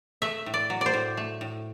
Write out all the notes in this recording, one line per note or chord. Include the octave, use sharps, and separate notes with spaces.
A3 E5
A2
D5
F#3
C5 D5
A2
A3
A2